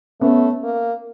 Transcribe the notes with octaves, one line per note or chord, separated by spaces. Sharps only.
A3 B3 C#4
A#3